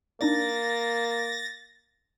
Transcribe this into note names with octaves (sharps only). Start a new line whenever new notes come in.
A#3 D4 D#4 D5 A6 A#6